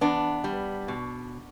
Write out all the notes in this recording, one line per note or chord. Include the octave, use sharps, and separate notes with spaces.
E2 B3 D4
G3
B2